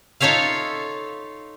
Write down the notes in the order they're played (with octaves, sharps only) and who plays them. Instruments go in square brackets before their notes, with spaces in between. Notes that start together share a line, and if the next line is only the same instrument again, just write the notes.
[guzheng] D#4 F4 A4 C#5 E5 F5